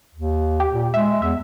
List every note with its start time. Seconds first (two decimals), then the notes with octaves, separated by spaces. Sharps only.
0.14 D#2
0.60 G4
0.72 A#2
0.94 G#3 E5
1.22 E2 E5